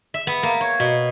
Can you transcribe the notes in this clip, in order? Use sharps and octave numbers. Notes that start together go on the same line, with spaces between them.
E5
B3
A#3
C#5
B2